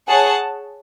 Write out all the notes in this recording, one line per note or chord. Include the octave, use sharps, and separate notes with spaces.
G#4 C#5 F#5 A5